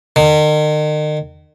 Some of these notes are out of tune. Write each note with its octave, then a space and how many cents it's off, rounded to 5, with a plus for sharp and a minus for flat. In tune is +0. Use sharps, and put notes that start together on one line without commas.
D#3 -40